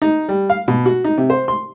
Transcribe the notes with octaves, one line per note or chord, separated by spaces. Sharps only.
D#4
G3
F5
B2
F#4
D#4
C3
C5
C6